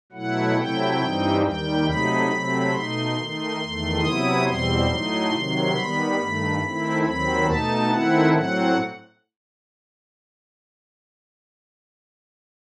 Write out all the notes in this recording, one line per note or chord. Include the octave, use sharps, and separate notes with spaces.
B2 F#3 A3 E4 F#5
C3 F#3 A3 E4 G5
G2 E3 G3 C4 D#4
D#2 D#3 G3 G5
C3 F#3 A3 D#4 B5
C3 F#3 A3 C4
B2 A3 D#4 C6
D#3 A3 D#4
E2 D#3 A3
C3 F#3 B3 E4 D#6
E2 B2 G3 C4 C6
A2 F#3 A3 D#4
C3 D#3 F#3
D#3 G3 B3 B5
G2 D#3 A3
D#3 A3 C4 E4
D#2 D#3 F#3 C4 B5
B2 A3 D#4 A5
D#3 A3 C4 E4 F#5
A2 F#3 C4 F#5